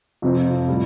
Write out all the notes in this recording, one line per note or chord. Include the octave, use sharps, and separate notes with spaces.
F2 C3 F3 C4 F4
A2 G3